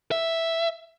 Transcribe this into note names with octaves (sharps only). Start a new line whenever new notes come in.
E5